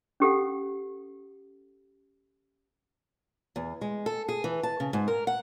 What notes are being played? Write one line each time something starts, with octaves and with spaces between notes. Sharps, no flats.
C#4 G4 A4 F#5
E2
G#3
A4
G#4
E3
A5
C#3
G#2
A#4
F#5